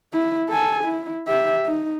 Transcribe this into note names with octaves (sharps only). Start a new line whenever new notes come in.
E4
A4 G#5
E4
G4 E5
D#4